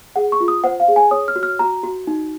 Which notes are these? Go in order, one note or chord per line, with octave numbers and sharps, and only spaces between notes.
G#4 F#5
C#6
F4
D#6
C5 F#5
F5
G#4
G#5
C#5 D#6
F6
F#4
F6
F#4 A#5
F#4
D#4